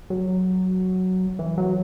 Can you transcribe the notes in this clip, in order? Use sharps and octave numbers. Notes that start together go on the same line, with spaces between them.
F#3
E3
F#3